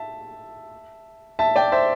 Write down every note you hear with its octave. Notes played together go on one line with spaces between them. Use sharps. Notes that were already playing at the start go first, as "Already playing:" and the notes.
Already playing: E5 A5
E5 A5
D5 G5
C5 E5